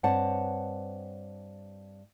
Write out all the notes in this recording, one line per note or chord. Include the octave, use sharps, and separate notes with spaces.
G2 C4 B4 C#5 F#5 A5